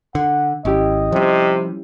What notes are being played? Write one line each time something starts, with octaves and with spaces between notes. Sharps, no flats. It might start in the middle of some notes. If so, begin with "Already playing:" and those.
D3 F#5
G#1 C#4 E4 G4 D#5
C3 F3 G3